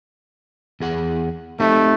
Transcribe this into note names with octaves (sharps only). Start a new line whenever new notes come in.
E2 G#4 F#5
A3 C4 D#4 G4